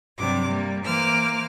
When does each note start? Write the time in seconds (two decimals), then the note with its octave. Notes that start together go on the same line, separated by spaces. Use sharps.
0.17 G2 C3 F#3 G3 D6
0.48 G3 A#3
0.84 E3 A#3 C5 D6 F6